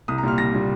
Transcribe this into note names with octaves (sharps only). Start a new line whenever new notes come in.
C2 D#6
A#5
A#2 G3 F6
C2 A#6
A#2 G3